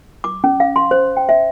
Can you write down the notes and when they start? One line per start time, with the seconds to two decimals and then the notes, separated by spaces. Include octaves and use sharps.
0.24 D6
0.44 C#4
0.60 F5
0.76 C6
0.91 C5
1.17 G5
1.29 E5